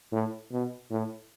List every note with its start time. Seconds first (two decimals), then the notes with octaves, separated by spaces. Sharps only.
0.12 A2
0.51 B2
0.90 A2